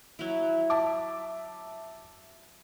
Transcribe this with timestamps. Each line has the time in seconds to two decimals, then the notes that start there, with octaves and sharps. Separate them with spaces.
0.19 F#3 E4
0.70 E5 A5 D6